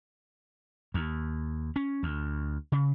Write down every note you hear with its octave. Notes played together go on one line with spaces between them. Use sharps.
D#2
C#4
D2
C#3